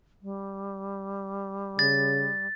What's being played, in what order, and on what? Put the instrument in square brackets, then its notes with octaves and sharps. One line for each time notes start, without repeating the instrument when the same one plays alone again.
[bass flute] G3
[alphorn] C#3 [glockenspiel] A6